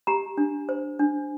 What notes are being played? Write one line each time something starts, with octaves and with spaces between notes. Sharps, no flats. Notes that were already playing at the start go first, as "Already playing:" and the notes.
G4 A#5
D4
C5
D4